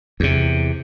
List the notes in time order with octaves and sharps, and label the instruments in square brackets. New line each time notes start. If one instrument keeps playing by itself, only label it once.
[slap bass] E2 C3